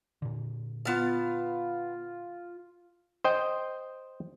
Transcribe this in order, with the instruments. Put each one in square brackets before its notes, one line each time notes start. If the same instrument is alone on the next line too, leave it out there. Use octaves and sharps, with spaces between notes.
[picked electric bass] A#2 D3
[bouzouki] B3 A5 [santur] F4 F5
[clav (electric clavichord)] C5 D#5 G5